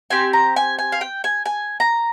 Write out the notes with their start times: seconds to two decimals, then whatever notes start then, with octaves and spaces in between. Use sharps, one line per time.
0.10 C4 G4 G#5
0.33 A#5
0.56 G#5
0.79 G#5
0.92 F5
1.01 G5
1.24 G#5
1.46 G#5
1.80 A#5